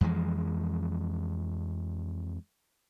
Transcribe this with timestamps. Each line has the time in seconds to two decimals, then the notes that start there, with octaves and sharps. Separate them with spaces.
0.01 F2 E3 F3 G#3